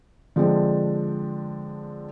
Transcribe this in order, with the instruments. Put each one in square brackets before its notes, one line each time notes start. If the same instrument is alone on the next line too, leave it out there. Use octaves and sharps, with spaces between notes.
[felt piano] D3 F3 G#3 C4 D4